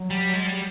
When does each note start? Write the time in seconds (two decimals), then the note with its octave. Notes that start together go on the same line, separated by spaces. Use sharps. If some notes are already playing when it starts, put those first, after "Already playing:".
Already playing: F#3
0.10 G3
0.33 G#3
0.46 G3